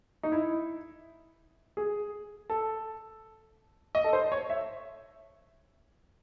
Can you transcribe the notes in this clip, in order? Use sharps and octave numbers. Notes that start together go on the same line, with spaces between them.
D#4
E4
G#4
A4
D#5
A4
C5
C#5
E5